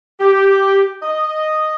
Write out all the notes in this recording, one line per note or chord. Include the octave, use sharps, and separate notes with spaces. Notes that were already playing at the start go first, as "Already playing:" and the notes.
G4
D#5